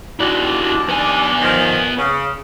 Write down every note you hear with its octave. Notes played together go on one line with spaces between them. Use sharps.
D#2 D4 E4 F#4
B3 G#5
D#3 F3
C#3